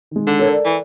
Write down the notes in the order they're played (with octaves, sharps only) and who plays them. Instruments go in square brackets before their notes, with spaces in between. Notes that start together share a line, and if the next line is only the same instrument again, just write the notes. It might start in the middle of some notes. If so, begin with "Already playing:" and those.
[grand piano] D#3 G#3
[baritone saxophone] D3
[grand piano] A4 A#4 [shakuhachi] C#5
[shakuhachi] D5
[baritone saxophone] E3